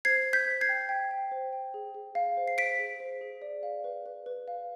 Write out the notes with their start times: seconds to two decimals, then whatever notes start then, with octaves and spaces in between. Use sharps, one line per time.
0.05 C5 G#6 C7
0.26 C5
0.33 G6 B6
0.48 C5
0.61 G#6 C7
0.69 G5
0.89 G5
1.11 G5
1.32 C5
1.53 G5
1.74 G#4
1.94 G#4
2.15 F5
2.37 C5
2.48 C7
2.58 C5 B6 D7
2.79 G#4
3.00 C5
3.21 G#4
3.42 D5
3.63 F5
3.84 B4
4.06 B4
4.26 B4
4.48 F5